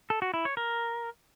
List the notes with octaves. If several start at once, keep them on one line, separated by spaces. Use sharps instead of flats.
A4
F#4
E4
C#5
A#4